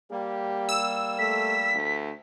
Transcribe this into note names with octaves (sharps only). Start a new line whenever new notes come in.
G3 A#3 G4
E6
A3 B6
D2